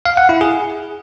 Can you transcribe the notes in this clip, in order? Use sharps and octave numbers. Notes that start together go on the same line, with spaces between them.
F5
F#5
E4
G#4